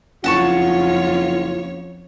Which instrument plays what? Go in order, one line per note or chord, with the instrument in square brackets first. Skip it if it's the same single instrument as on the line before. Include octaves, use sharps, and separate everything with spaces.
[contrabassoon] F#1 [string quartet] F2 C#5 [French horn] F4 [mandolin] F#5 A5 C#6